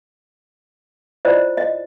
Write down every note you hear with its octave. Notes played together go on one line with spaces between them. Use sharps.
E4 F4 C5 D5 D#5
D#5